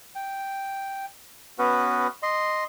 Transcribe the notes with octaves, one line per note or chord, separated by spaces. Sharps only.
G5
B3 C#4 F#4 B4
D#5 C6